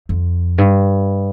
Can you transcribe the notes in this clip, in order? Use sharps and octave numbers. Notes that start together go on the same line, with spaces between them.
F2
G2